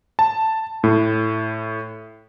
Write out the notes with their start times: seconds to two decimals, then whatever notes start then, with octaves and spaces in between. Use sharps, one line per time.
0.19 A5
0.84 A2